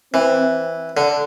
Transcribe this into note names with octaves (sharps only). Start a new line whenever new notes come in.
E3 C4
D3